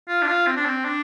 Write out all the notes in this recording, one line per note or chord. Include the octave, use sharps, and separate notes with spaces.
F4
D4
F4
C4
D4
C4
D4